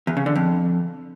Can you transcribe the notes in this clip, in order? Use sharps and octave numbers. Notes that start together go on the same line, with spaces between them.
E2
C#3
D3
F2